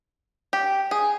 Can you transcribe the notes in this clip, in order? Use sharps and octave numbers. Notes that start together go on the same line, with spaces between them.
G4
G#4